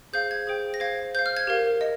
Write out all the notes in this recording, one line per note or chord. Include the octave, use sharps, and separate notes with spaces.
G#4 C5 F5 G6
G#6
G#4 C5 G5
A#6
C5 F5 G#6
C5 F5 G6
F6
G#6
G4 A#4 F5
D#5